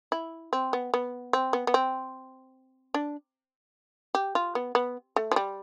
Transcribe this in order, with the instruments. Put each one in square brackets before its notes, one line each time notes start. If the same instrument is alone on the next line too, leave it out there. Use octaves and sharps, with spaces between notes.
[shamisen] E4
C4
B3
B3
C4
B3
B3
C4
D4
G4
F4
B3
B3
A3
F3
G3